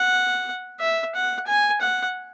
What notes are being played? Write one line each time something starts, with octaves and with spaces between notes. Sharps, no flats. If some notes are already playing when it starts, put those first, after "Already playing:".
Already playing: F#5
E5
F#5
G#5
F#5